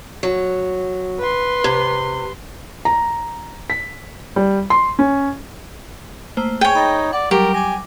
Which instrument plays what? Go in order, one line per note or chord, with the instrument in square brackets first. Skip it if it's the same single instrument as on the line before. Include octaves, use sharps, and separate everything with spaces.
[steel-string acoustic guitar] F#3
[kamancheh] B4 C6
[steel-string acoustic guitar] C3
[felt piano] A#5
B6
G3
C6
C#4
[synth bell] A3 A#3 C5
[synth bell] G#4 [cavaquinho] C#5 G5 [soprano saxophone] G#5
[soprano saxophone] D#4 [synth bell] B5 A6 A#6
[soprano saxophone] D5 [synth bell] F#5
[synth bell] F#3 G3 [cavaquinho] G4 [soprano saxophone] A#4
[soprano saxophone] G#5 [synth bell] D6 A#6